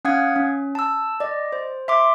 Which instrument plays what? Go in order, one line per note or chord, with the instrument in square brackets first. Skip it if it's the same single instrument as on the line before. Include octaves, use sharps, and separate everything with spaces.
[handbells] C#4 F5 F#5 D#6 G#6
C#4
A5 E6
D5 D#5
C5
E5 C6 D6